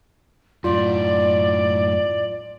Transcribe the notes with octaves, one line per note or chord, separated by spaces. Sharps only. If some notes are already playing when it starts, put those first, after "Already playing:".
F#2 A2 F4 D5